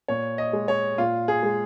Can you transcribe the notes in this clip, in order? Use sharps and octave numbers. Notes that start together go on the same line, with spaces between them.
A#2 C#5
D#5
G#3
C#5
A#2 F4
G#4
G#3